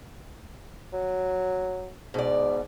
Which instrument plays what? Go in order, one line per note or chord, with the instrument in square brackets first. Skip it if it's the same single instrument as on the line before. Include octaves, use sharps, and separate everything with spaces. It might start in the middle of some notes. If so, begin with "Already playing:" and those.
[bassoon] F#3
[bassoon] G#2 [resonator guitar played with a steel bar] B2 D5